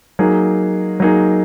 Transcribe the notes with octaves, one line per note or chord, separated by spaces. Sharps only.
F#3 A#3 D#4 G#4
F#3 A#3 D#4 G#4